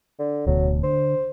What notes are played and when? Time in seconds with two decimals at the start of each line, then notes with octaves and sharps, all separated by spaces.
0.19 D3
0.46 D1 D2 B2 F#3
0.83 D3 C5